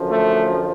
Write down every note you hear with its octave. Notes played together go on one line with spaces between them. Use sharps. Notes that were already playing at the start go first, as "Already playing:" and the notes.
Already playing: F#2 D3 F3
A3